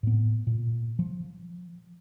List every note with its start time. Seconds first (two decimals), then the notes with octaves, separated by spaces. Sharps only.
0.03 A2 B3
0.47 A#2
0.99 F3